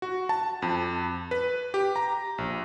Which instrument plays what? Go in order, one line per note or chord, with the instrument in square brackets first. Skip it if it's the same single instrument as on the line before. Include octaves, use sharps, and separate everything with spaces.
[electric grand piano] F#4
A5
F2
B4
G4
A#5
A#1